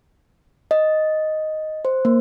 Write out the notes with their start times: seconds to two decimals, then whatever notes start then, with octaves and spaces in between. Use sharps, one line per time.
0.71 D#5
1.85 C5
2.05 A#3